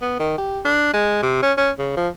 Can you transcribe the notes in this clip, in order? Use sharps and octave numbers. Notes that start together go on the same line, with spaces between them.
B3
D#3
G4
D4
G#3
C3
C#4
C#4
C#3
F3